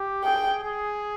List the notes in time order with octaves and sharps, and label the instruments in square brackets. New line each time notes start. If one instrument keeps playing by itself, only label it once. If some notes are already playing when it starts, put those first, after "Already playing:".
Already playing: [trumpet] G4
[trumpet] G#4 [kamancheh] G5
[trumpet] G#4